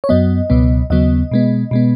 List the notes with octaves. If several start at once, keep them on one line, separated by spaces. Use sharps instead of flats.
C#5
F#2 F#3 B3 D#5
C#2 B2 F#3 B3
D#2 C#3 F#3 B3 D#5
B2 G#3 B3
B2 G#3 B3